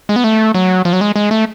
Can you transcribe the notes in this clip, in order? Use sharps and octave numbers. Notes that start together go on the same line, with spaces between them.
G#3
B3
A3
F#3
F3
F#3
G#3
G#3
A3